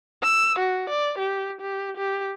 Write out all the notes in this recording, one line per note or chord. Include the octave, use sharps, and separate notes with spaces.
E6
F#4
D5
G4
G4
G4